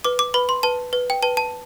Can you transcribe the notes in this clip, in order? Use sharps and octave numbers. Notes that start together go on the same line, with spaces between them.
B4 D6
D6
B4 B5
C6
B4 A5
B4
G5
B4 A5
A5